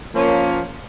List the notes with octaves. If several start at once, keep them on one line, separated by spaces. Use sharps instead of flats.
F3 A#3 C#4